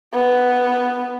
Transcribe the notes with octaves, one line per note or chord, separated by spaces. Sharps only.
B3